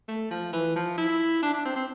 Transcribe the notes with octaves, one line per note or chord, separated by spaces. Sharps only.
A3
F3
E3
F3
E4
D4
D4
C4
C4